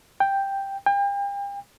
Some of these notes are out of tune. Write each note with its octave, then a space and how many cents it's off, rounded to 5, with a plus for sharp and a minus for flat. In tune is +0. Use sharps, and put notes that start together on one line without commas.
G5 +5
G5 +40